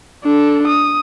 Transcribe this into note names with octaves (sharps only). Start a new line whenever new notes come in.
D4 A4
D#6